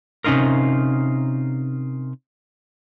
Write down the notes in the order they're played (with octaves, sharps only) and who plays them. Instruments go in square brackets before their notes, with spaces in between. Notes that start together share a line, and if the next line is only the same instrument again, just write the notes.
[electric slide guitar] C3 C#4 D#4 F4 A#4